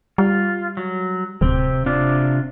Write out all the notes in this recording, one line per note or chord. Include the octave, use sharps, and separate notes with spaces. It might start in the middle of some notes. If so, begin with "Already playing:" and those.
G3 F4
F#3
D1 C3 C4
C3 D4 F4